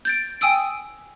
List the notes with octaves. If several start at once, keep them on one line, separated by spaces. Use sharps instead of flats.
G6 A6 D7
G5 G#5 D#6 E6 D7